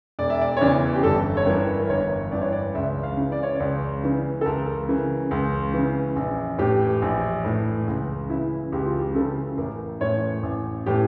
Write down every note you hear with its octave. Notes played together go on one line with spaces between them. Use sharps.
E1 D5
E5
D5
C#5
E2 C#3 E3 D5
G4
G1 A4
C#5
G2 E3 A#4
A#4
G1 C#5
G2 E3 D5
C#5
D5
C#2 E5
F5
C#3 E3
D5
C#5
C#2 D5
C#3 E3
A4
C#2 A#4
C#3 E3
C#2
C#3 E3
A#1
A2 E3 G4
A#1
A2 E3
C#2
C#3 E3 E4
C#2 G4
F4
G4
C#3 E3 A4
A1 A#4
A2 E3 C#5
A1
A2 E3 G4